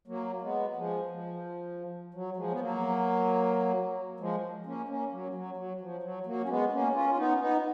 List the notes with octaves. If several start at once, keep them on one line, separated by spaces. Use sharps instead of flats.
F#3 A#3
G#3 B3
F3 G#3
F3
F#3
F3 G#3
B3
F#3 A#3
F3 G#3
A#3 C#4
A#3 C#4
F#3
F#3
F#3
F3
F#3
F#3 A#3
C#4
G#3 B3
A#3 C#4
C#4 F4
F4
B3 D#4
B3 D#4